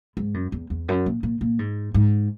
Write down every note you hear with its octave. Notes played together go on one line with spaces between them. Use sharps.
G#2
F#2
E2
E2
F#2
A#2
A#2
A#2
G#2
G#2